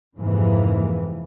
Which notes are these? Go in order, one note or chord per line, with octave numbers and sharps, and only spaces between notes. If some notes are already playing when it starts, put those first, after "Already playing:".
F2 G#2 C3 E3 A#3